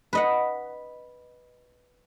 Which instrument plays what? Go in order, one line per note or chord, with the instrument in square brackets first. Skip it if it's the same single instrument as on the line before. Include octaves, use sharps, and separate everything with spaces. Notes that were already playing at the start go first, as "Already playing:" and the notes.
[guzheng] B4 D#5 F#5